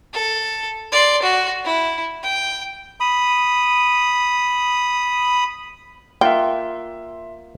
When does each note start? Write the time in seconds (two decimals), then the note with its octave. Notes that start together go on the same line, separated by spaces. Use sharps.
0.14 A4
0.92 D5 C6
1.22 F#4
1.65 E4
2.23 G5
3.00 B5 D#6
6.21 A#3 F4 E5 F#5 G5 C6